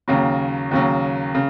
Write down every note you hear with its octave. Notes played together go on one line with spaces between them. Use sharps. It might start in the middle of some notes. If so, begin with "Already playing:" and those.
D#2 C#3 F#3
D#2 C#3 F#3
C#3